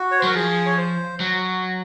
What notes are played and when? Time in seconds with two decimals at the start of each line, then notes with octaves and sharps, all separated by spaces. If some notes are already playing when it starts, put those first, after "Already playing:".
Already playing: F#4
0.11 C#5
0.19 C5
0.23 F#3 A#4
0.35 F3 G#4
0.66 C#5
0.77 C5
1.20 F#3